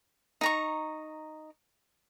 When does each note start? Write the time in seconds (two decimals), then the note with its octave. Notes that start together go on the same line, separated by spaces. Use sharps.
0.41 D#4 A#5 C#6